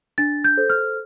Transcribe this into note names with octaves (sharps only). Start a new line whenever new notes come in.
D4 A6
G6
A4 C5
F6